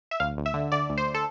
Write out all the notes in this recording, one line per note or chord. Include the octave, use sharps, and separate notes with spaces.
E5
D2 F5
D2
E5
D3
D3 D5
D2
C5
A4